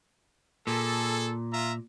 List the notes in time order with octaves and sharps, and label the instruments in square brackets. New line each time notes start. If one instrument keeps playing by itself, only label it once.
[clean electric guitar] A#2 [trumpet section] G#4 A4
[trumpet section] F4 E5 A#5